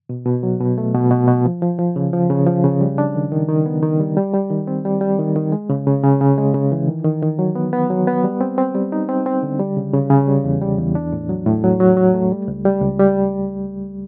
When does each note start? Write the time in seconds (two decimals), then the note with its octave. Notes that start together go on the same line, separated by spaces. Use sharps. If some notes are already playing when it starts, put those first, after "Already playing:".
0.09 B2
0.26 B2
0.43 F#3
0.60 B2
0.78 A3
0.95 B2
1.11 B2
1.28 B2
1.45 F3
1.62 F3
1.79 F3
1.96 C#3
2.13 F3
2.30 C#3
2.46 F3
2.64 C#3
2.81 G3
2.98 D4
3.15 D#3
3.32 D#3
3.48 D#3
3.66 B3
3.83 D#3
4.00 G3
4.17 G3
4.34 G3
4.50 D#3
4.67 C4
4.85 G3
5.01 G3
5.19 D#3
5.36 D#3
5.52 G#3
5.70 C#3
5.87 C#3
6.03 C#3
6.21 C#3
6.38 G#3
6.54 C#3
6.72 E3
6.88 D#3
7.05 D#3
7.22 D#3
7.39 F#3
7.55 B3
7.73 B3
7.90 F#3
8.07 B3
8.24 G3
8.41 C4
8.58 C4
8.75 G3
8.92 D#4
9.09 C4
9.26 C4
9.43 D3
9.60 G3
9.77 C#3
9.93 C#3
10.10 C#3
10.27 G3
10.44 E2
10.61 G3
10.78 E2
10.95 D4
11.12 A2
11.29 F#3
11.46 A2
11.64 F#3
11.80 F#3
11.97 F#3
12.14 A3
12.32 G3
12.48 C#2
12.65 G3
12.82 C#2
13.00 G3